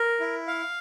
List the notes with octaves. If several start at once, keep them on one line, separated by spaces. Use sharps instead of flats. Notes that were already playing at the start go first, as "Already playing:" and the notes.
Already playing: A#4
E4
F5